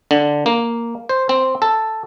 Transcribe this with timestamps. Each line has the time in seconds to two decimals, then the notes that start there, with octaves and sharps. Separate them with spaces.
0.11 D3
0.46 A#3
1.09 C5
1.29 C4
1.62 A4